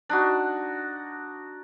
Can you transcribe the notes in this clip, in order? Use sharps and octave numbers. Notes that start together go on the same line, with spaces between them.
D4 D#4 F#4